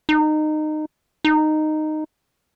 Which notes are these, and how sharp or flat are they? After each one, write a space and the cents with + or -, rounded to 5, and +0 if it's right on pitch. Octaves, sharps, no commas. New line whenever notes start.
D#4 -20
D#4 -10